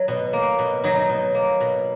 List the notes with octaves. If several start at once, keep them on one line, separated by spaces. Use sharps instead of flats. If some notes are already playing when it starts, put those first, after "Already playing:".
Already playing: F#3
B2
A#3
B2
F#3 D#4
B2
A#3
B2